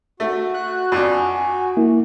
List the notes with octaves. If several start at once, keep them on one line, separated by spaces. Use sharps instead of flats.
A3 F#4
F#6
F2 D4 G#5
A#3 E4